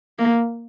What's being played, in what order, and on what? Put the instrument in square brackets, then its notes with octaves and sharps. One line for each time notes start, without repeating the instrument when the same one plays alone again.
[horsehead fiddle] A#3